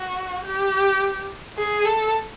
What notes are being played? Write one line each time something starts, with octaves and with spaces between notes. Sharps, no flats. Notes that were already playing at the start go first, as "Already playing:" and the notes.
Already playing: F#4
G4
G#4
A4